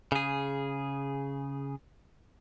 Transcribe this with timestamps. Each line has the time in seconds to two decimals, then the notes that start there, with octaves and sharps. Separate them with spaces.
0.12 C#3 G#4